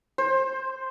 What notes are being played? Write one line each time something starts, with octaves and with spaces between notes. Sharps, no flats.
C5